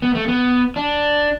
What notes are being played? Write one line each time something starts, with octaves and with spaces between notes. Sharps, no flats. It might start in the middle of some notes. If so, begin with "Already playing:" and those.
B3
A3
B3
D4